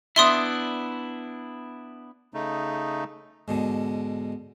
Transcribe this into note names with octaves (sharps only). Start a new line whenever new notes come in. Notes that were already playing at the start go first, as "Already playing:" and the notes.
B3 D4 E4 E5 C6 D#6
C#3 A3 D#4
G#2 B2 D3